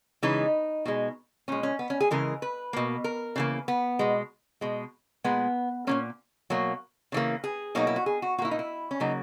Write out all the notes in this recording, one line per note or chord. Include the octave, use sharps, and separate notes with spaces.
C#3 E3 G#3 D#4
B2 G#3
A#2 G#3 C#4
C#4
B3
C#4
G#4
C#3 E3 G#3 A#4
B4
B2 A#3
A#4
C#3 E3 A#3
B3
B2 G#3
B2 G#3
A#2 G#3 B3
A#2 F#3 A#3 C#4
B2 F#3 A#3
C#3 E3 A#3
G#4
B2 F#3 A#3 D#4
E4
F#4
G#4
F#4
A#2 A#3 E4 F#4
D#4
E4
C#4
C#3 F#3 A#3 D#4